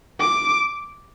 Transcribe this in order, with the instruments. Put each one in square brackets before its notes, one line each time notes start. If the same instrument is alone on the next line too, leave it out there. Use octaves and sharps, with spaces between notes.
[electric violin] D6